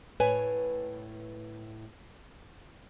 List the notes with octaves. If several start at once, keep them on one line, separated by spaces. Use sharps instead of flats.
A2 B4 C#5 G#5